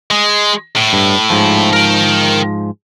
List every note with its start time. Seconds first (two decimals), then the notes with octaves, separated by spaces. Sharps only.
0.11 G#3
0.77 A2
0.93 G2
1.30 G#2 F3
1.73 A#4 G5